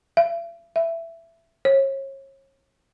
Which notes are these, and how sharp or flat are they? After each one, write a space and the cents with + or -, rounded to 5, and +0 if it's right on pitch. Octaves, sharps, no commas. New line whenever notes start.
E5 +45
E5 +15
C#5 -35